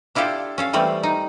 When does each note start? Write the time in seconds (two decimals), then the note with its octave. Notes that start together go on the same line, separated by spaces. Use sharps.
0.15 D4 E4 F4 G4 A4
0.58 C#4 A4 F5
0.73 E3 G3 A3 C4
1.03 D#4